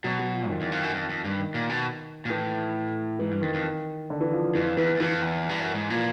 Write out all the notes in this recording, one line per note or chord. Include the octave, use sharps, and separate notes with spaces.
B2 F#3
F#3
F3
F2 D#3
E2
F2
F#2
F2
F2
G2
D#3
A#2
B2
A#2
A2 E3
G#2 E3
G2
F2 D#3
F2
D3
E3
F3
F3
F2 E3
E2 E3
E2
F2 E3
E2
G2
F#2
G#2
A#2 F3